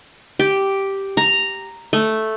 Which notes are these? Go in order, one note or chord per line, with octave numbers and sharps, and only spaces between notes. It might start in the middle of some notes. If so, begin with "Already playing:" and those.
G4
A#5
A3